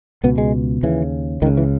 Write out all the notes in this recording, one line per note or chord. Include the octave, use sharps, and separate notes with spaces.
C#2 B2 B3
G#3
D#2 C#3 E3
C#2 C#3 D#3
E3